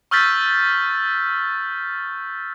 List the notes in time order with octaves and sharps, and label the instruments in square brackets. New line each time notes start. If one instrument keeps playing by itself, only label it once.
[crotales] C#6 E6 F6 G6 A6 B6